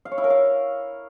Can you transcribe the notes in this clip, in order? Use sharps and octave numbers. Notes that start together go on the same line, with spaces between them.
F5
C#5
E4
A#4
F5